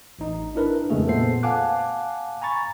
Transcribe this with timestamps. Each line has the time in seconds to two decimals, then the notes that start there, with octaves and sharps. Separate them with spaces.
0.19 A1 D#4
0.55 D4 E4 A#4 B4
0.89 F2 C#3 G#3 A3 G#4
1.07 A#2 B3 A4 C5 C7
1.43 F5 F#5 G#5 A5 D6 F#6
2.42 G#5 A#5 B5 C#6 A6